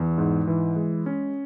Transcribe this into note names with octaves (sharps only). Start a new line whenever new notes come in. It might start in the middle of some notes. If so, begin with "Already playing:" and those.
Already playing: E2
G#2
E3
G#3
C#4